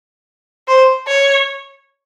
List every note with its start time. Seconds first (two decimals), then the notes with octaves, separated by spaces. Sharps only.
0.68 C5
1.08 C#5